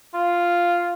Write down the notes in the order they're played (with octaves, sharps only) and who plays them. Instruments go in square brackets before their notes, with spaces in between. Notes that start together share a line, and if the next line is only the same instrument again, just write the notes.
[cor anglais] F4